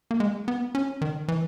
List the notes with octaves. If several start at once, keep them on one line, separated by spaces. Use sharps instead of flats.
A#3
G#3
B3
C#4
D#3
E3